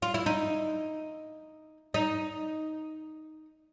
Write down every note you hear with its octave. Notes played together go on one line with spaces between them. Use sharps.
F4
E4
D#4
D#4